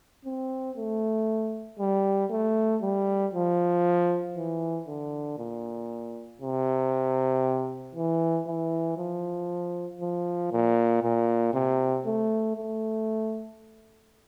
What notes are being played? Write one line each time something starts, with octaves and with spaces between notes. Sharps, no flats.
C4
A3
G3
A3
G3
F3
E3
D3
A#2
C3
E3
E3
F3
F3
A#2
A#2
C3
A3
A3